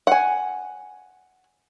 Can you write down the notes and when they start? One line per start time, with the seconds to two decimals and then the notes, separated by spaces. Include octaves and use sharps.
0.07 F#5 G#5